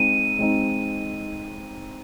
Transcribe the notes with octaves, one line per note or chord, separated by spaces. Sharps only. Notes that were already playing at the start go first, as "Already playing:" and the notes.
Already playing: G#3 C4 D#4 D#7
G#3 C4 D#4